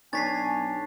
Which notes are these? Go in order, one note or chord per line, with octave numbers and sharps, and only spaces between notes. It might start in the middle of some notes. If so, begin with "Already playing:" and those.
B1 D4 C#5 G#5 A6 B6 C7